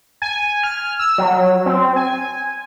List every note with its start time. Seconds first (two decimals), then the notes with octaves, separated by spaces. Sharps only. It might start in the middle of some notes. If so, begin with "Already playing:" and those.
0.22 G#5
0.63 F6
0.99 E6
1.18 F#3
1.66 C4
1.96 G#5